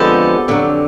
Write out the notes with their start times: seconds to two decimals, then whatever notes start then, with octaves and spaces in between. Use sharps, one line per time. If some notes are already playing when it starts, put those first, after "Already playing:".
Already playing: F2 D3 F3 G#3 B3 G4 A4
0.48 F2 D3 F#3